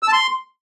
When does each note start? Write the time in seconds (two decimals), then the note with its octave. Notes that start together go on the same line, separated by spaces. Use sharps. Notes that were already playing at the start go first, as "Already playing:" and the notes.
0.03 E6
0.08 A5
0.13 C6